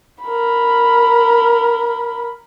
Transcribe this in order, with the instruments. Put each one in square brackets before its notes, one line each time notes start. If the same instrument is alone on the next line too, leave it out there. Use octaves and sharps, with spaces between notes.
[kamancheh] A#4 B5